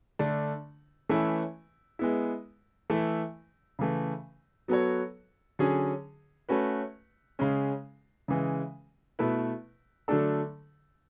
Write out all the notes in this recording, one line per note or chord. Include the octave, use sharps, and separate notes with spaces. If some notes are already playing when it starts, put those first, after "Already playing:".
D3 A3 D4
E3 A3 C#4 E4 B4
G#3 B3 E4
E3 A3 E4
C#3 E3 A3
F#3 B3 F#4 A4 C#5
D3 F#3 C#4 G#4
A3 C#4 F#4 B4
C#3 G#3 C#4
C#3 E3 G#3
B2 A3 E4 B4
D3 F#3 A3 D4 A4